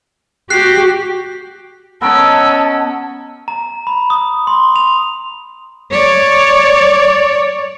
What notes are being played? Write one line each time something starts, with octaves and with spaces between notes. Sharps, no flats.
F#4 G4 F#6 C7
B3 C#4 A#4 D#5 A5 E6
A#5
B5
D#6
C6
F7
C#5 D5